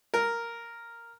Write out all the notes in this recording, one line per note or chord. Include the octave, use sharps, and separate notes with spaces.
A#4